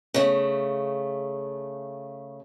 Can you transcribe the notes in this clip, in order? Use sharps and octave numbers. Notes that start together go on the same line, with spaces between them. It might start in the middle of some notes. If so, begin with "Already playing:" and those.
C#3 A3